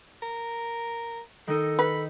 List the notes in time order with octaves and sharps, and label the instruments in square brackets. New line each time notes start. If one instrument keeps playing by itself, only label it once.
[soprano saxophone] A#4
[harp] D#3 D#4 [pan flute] A4
[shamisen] B4 [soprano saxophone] B5